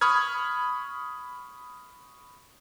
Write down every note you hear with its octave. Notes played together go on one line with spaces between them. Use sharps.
B5 C#6 D#6 F6 G#6